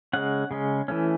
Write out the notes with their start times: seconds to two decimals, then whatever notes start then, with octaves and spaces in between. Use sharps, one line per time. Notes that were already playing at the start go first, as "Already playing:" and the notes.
0.13 C#3 G#3 C#4 F#5
0.51 C#3 G#3 C#4
0.88 E3 A3 C#4